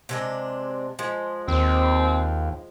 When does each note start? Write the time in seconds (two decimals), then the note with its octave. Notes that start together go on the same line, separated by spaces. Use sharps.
0.09 C3 G#3 D4
0.99 F3 G#3
1.48 D#2 C4